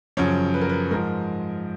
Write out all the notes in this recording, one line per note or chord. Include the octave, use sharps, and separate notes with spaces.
F#2 C#3 F3 C#5
B4
A#4
B4
G#2 F3 A#4